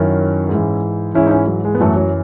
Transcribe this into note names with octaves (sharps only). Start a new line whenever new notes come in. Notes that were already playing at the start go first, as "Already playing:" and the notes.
Already playing: F#2 D#3 F#3 C#4 E4
G#2
E3
G#2 E3 C#4 E4
D#4
C#4 E4
F#3
G#3
B3
F#2 E3 F#3 A3
F#3